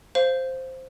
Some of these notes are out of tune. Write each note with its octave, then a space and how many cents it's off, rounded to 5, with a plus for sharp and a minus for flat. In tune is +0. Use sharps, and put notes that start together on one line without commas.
C5 +0 F5 +0